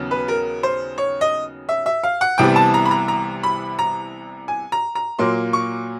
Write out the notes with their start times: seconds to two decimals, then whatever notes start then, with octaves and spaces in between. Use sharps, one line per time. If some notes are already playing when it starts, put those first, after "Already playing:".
Already playing: D#2 C#3 F#3 B3
0.11 B4
0.28 A#4
0.63 C5
0.98 C#5
1.21 D#5
1.69 E5
1.86 E5
2.03 F5
2.21 F#5
2.38 C2 C3 E3 G3 B3 G5
2.56 A5
2.74 A#5
2.85 B5
2.91 A#5
3.08 A#5
3.43 B5
3.79 A#5
4.48 G#5
4.72 A#5
4.95 A#5
5.19 A#2 F#3 A#3 C6
5.53 C#6